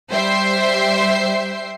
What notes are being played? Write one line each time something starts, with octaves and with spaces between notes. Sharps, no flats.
G3 C5 E5 G5 C6 C7